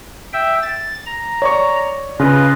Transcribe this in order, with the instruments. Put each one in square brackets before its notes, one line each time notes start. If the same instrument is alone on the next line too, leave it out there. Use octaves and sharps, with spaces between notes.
[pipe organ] E5 G5
A6
A#5
[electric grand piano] C#5 D5 C#6
[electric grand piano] C#3 [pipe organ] F4 B4 D#5